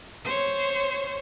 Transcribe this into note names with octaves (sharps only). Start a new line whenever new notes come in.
C5 C#5